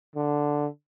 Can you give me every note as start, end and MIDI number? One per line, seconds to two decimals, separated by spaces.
0.16 0.66 50